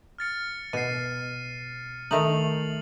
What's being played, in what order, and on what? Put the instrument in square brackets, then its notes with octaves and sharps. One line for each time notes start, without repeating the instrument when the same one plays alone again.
[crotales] F6 A6 C#7
[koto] B2 [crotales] C7 D#7
[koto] D#3 A3 D#4 [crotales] F7 F#7